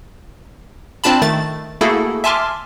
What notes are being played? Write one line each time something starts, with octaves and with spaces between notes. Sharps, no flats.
C4 D4 F4 A5 B5
D#3 A3 A6
A3 A#3 E4 F#4 G#4 A4
E5 G#5 A5 C6 D6 F6